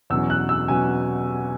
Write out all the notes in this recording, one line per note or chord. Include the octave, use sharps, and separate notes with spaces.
E2 B2 F#3 C#4 E6
F#6
E6
B2 F#3 C#4 G#5